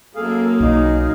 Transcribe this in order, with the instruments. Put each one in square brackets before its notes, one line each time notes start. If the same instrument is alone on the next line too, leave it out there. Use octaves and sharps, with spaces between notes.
[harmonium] F#2 G#4 F5 [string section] A#3 [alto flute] A4
[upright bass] B1 [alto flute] D#4